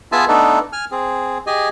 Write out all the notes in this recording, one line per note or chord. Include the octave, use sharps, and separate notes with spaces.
B3 F4 G#4 E5 G#5 A5
A3 B3 D4 D#4 A4
G#5 F6
C4 G#4
G4 G#4 D#5 G#5